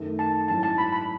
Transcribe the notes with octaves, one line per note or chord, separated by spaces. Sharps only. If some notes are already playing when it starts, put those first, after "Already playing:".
Already playing: F#2 D#3 A3
A5
G#2 F#3 C#4 E4 A5
A5
B5
B5